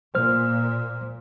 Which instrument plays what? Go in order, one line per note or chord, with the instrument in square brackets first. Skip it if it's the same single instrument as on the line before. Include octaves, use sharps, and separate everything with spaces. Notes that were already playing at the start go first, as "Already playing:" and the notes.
[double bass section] A#2 [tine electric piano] C5 F6